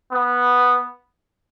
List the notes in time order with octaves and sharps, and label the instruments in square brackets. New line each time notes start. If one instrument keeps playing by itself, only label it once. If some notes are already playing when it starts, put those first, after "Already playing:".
[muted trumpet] B3